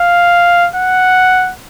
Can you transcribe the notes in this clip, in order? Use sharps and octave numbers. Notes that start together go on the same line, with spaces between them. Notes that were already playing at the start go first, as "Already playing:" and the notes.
Already playing: F5
F#5